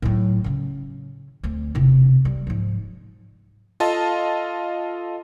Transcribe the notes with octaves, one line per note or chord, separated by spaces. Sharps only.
A2 F#3
C#3 C#4
D2 C4
E1 C3
G3
G#2 F3
F4 A4 D#5 F5 A5